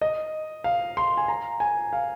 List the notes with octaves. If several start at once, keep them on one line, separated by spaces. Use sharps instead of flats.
D#5
F5
C6
G#5
A#5
G#5
F5